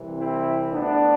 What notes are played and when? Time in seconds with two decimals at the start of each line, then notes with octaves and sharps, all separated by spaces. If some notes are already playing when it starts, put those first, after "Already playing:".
Already playing: C2 C3 E3
0.18 C4 E4
0.72 D2 D3 B3 D4